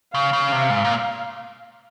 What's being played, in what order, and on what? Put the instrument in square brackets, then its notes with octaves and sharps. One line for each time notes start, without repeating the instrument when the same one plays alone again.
[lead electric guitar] C#3 [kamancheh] F5
[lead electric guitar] C#3
C3
G#2
A#2